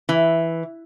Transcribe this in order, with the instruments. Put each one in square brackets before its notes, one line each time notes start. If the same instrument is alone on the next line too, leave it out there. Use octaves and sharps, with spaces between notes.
[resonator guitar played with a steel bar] E3